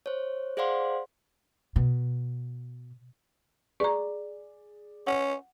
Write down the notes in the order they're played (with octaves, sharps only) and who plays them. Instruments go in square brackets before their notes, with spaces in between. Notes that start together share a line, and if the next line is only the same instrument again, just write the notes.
[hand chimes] C5 C#5
G#4 C5 D5 F5 F#5 C6
[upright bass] B2
[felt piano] G#4 D5 [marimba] A#5 C#6
[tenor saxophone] C#4 [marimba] F#5